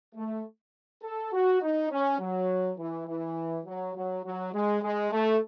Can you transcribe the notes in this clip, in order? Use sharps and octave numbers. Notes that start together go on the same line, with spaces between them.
A3
A4
F#4
D#4
C#4
F#3
E3
E3
F#3
F#3
F#3
G#3
G#3
A3